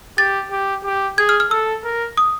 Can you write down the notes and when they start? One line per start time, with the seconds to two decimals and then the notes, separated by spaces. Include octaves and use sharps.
0.18 G4 A6
0.52 G4
0.85 G4
1.18 G#4 G#6
1.29 F6
1.40 F6
1.51 A4 E6
1.84 A#4
2.17 D#6